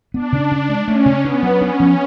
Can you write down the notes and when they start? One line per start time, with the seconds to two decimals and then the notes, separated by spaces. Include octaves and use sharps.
0.14 B3 D4
0.32 C#3
0.51 C#3
0.69 G#3
0.87 A3 C#4
1.06 C#3
1.24 B3 D4
1.43 F#3
1.60 C#4 D4
1.80 F3